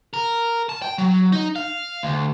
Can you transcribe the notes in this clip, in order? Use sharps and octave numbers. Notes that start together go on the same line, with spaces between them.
A#4
A5
G5
F#3
D#4
F5
D2